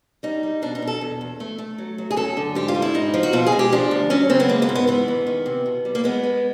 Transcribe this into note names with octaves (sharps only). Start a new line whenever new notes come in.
G3 D#4
G3
B2 D4
D#4
B2
A4
E2
E2
A3
A3
F#3
F#3
G#4
F#2 A4
D3
G#2 G4
F4
G3
E4
G#2 D#4
F3
F#4
B2 F4
G#4
G#3
G4
F3 D4
D2
F#3 C#4
C#3 C4
B3
G#3 A#3
B3
G#2
B3
E3 B3
E2
D#3
C3
B2
G3
A#3
G#3 B3
G#3